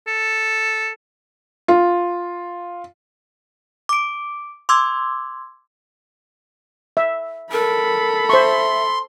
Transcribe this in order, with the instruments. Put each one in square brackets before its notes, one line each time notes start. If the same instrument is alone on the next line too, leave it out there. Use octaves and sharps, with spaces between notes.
[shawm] A4
[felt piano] F4
[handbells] D6 D7
C6 D6 E6 G#6
[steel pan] E5
[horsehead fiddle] A4 B5 [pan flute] A#4
[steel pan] C5 C#6 [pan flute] E5 [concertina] C6